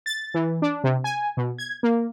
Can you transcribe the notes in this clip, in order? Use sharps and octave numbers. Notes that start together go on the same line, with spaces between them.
A6
E3
D4
C3
G#5
B2
G#6
A#3